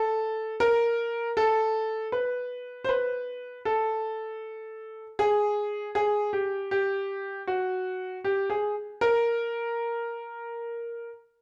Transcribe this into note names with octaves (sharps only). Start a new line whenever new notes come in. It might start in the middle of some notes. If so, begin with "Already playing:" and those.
Already playing: A4
A#4
A4
B4
C5
B4
A4
G#4
G#4
G4
G4
F#4
G4
G#4
A#4